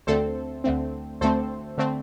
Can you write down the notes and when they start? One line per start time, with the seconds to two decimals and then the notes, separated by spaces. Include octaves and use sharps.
0.07 D2 D3 A3 C4 A4 C5
0.64 D2 D3 A3 C4
1.21 D2 D3 A3 C4 A4 C5
1.78 D3 A3 C4